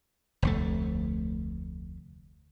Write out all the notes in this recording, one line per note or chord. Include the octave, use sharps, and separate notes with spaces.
F1 D2 A3